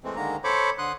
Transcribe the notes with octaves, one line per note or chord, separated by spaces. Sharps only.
E3 G#3 A3 C4
D3 D#3 G#3 A#3 A#5
A4 C5 C#5 B5 C#6 D6
D3 C6 D#6 F#6